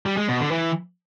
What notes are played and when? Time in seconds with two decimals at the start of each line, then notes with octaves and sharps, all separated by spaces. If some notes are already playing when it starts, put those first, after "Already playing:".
0.06 G3
0.17 G#3
0.29 B2
0.40 D3
0.51 E3